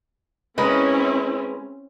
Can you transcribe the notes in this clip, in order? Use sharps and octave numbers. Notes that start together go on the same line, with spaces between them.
G#3 C4 C#4 E4 A#4 B4